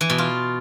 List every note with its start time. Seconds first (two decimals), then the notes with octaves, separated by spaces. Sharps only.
0.01 E3
0.10 B2
0.18 F4